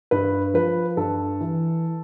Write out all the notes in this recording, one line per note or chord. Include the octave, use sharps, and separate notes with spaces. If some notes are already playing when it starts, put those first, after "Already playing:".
G2 B4
F3 B4
G2 A4
E3